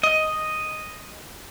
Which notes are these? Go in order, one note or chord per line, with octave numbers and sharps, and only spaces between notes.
D#5